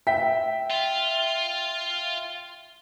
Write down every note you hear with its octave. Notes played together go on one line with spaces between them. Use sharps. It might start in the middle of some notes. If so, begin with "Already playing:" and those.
E5 G5 B6
F4